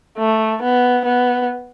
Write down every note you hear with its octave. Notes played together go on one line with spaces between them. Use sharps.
A3
B3
B3